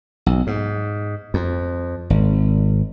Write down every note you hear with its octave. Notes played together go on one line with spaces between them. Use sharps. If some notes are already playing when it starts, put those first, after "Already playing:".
B1
G#2
F2
G#1